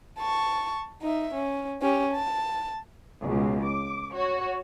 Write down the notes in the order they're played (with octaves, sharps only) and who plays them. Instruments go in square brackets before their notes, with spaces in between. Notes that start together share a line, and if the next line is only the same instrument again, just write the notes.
[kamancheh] A5 C#6
D#4 E5
C#4
C#4 G4
A5
[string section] C#2 B2
D6
F#4 C#5